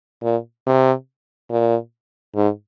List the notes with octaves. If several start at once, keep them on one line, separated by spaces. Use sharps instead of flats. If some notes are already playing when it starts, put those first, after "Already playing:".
A#2
C3
A#2
G#2